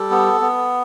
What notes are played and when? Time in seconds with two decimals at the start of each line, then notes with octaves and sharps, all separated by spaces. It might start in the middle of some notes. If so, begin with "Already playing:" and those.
Already playing: G3 A4
0.11 B3
0.41 B3